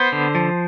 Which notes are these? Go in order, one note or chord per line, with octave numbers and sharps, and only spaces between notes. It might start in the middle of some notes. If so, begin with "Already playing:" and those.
Already playing: B3 C5
D3
F3